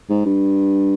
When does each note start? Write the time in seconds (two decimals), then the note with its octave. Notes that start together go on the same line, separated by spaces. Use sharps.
0.09 G#2
0.25 G2